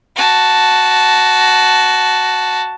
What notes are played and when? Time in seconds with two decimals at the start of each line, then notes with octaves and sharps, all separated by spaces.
0.16 F#4 A5